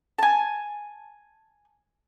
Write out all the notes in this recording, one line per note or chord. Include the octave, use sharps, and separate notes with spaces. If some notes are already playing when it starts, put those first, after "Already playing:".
G#5 A5